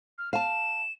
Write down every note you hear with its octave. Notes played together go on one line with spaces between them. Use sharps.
F6
F5 A5 E7